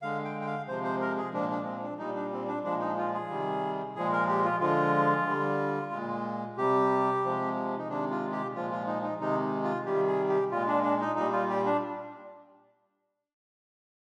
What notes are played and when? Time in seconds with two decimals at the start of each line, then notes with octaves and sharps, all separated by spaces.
0.02 D3 G#3 F5
0.25 G5
0.41 G5
0.47 F5
0.68 C3 F3 G#3 C5
0.84 C5
1.01 A#4
1.18 G#4
1.33 A#2 F3 G#3 D4
1.50 D4
1.66 C4
1.82 D4
1.99 A#2 G3 D#4
2.15 D4
2.32 C4
2.48 D4
2.64 A#2 F3 G#3 D4
2.80 D#4
2.97 F4
3.14 G#4
3.29 C3 D#3 G3
3.96 A#2 F3 G#3 G#4
4.12 A#4
4.28 G4
4.45 F4
4.60 D3 F3 G#3 F4
5.27 D3 G3
5.92 A#2 G#3
6.57 C3 G3 G4
7.23 C3 F3 G#3
7.77 D#4
7.89 C3 D#3 G#3 D4
8.11 F4
8.32 G4
8.54 A#2 F3 G#3 F4
8.71 F4
8.87 D#4
9.03 D#4
9.20 C3 D#3 G#3 D#4
9.64 F4
9.85 C3 D#3 G3 G4
10.07 G#4
10.29 G4
10.51 A#2 G#3 F4
10.68 D4
10.83 D4
11.01 D#4
11.16 A#2 G3 D#4
11.32 F4
11.50 G4
11.66 D4